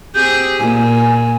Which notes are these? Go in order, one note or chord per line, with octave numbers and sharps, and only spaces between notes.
C4 G4 G#4 G6
A#2 G#5